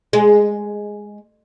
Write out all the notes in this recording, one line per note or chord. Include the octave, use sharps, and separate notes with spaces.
G#3